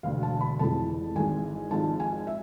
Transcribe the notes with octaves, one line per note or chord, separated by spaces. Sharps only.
E1 D2 D3 F5
A5
B5
F1 F2 E3 G#3 A5
G#1 G#2 E3 G#3 G#5
G#1 G#2 F3 G#3 A5
G#5
E5